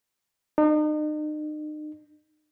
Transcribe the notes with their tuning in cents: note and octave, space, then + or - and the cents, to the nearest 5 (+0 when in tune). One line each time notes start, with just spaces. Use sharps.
D#4 -40